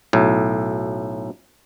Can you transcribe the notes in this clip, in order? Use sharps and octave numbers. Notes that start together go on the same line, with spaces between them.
B1 A2